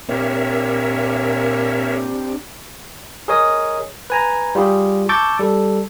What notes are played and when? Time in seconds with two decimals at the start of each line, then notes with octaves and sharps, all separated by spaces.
0.09 A#2 C4 D4 G4 A#4 C#5 E5
3.28 G#4 A#4 C#5 D#5 D#6
4.10 B4 G#5 A#5
4.55 G3 F4 G4 G#4
5.09 A5 C#6 D6 E6 G6 A6
5.39 G3 A4